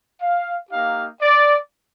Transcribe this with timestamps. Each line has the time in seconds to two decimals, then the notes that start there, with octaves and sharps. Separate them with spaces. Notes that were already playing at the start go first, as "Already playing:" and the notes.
0.22 F5
0.71 A#3 D#4 G4 F5
1.22 D5